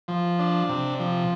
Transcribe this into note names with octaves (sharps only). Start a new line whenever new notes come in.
F3
D4
C3
F3